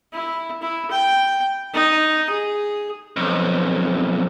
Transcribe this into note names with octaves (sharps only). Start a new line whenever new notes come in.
E4
E4
G5
D#4
G#4
B1 F2